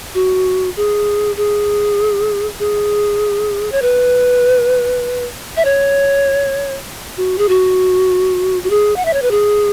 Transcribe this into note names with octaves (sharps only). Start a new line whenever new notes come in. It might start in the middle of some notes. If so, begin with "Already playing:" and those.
F#4
G#4
G#4
G#4
C#5
B4
E5
C#5
F#4
G#4
F#4
F#4
G#4
F#5
E5
C#5
B4
G#4